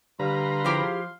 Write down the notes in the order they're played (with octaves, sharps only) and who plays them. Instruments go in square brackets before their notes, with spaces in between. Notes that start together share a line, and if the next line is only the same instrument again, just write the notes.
[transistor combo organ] D3 B4 A#5 [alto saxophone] G3 [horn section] F5 C6
[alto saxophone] F3 [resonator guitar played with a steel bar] E4 G4 G#4